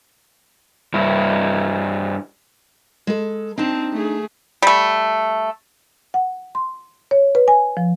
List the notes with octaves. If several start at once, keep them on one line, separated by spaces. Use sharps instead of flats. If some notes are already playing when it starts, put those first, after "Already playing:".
G2 E4
G#3 A4
C4 D4 D#4 A5
A3 G#4
G3 A3
F#5
C6
C#5
B4
G#5
F3